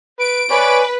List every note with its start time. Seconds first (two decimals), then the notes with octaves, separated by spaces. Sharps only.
0.19 B4 D7
0.51 B4 C#5 D5 G#5